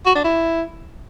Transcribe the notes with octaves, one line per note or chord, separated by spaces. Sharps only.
F#4
D4
E4